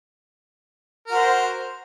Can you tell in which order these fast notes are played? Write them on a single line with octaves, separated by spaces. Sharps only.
A#4 F#4 C5